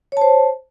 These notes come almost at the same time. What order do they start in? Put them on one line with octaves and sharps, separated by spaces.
C#5 A5 C5